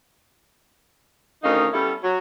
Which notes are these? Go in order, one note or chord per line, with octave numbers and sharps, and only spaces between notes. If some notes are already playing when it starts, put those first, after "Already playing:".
D2 D#3 C#4 D#4 D#5 F5
G3 B3 C#4 E4 G4 A4
F#3